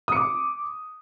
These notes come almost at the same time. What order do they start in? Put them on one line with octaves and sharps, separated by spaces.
D#6 C#7 D6